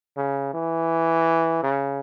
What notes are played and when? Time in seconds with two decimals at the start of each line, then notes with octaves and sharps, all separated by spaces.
0.17 C#3
0.54 E3
1.63 C#3